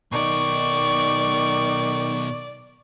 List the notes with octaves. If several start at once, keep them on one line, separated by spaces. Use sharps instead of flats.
B2 D#3 D#4 D5 C#6